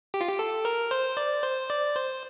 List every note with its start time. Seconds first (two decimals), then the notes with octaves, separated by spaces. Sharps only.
0.14 G4
0.21 F4
0.28 G4
0.39 A4
0.65 A#4
0.91 C5
1.17 D5
1.43 C5
1.70 D5
1.96 C5